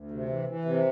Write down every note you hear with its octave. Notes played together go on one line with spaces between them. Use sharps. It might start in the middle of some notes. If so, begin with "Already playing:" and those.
Already playing: D2
C3
E3
E3
C3